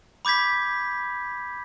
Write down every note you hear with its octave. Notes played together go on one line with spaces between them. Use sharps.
B5 D6 G6 G#6 B6